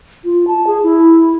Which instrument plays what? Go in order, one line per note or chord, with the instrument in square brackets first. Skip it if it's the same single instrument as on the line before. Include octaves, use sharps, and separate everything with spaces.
[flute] F4
A5
G#4
E4